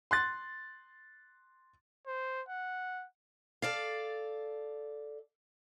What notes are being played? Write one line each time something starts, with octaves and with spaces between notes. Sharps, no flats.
C6 F#6 A6
C5
F#5
A4 D5 F5